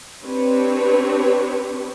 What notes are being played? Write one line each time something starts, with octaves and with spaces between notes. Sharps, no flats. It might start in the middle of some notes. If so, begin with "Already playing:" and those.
C4 D4 G4 B4 C#5